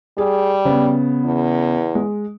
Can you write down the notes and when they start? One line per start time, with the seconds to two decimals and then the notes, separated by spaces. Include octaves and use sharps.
0.18 G3 G#4
0.65 C#3 B3
1.24 E2
1.95 G#3